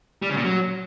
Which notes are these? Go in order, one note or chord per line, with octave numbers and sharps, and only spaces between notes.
G3
C#3
A#2
F#3